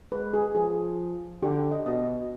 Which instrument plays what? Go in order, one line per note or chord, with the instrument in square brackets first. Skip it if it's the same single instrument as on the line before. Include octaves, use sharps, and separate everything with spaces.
[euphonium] G#3 [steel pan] B4
[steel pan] G#4
[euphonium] F3 [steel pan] G#4
[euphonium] D3 [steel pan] G4
[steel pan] D#5
[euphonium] B2 [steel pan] D#5